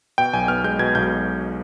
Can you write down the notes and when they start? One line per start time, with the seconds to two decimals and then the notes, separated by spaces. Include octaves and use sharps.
0.18 B2 G5
0.33 B1 G#5
0.48 B3 F6
0.64 G#3 G6
0.79 B2 G#6
0.95 B1 G6